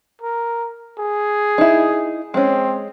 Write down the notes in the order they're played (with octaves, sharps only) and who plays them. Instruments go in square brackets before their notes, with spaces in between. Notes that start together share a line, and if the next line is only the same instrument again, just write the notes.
[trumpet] A#4
G#4
[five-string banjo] D#4 E4
[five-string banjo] G#3 C#4 [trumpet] C4